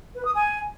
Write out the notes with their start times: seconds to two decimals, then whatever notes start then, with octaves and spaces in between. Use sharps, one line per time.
0.15 B4
0.25 D#6
0.35 G#5